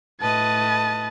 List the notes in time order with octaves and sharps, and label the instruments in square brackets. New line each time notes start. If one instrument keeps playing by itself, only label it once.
[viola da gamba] A2 B4 D#5 [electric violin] A5